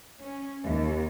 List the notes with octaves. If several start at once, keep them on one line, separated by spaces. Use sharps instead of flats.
C#4
D#2